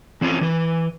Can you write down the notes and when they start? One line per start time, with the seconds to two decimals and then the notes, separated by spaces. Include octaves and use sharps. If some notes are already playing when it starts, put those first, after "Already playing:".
0.21 E3 C4 C#4 E4 F4
0.41 E3 B4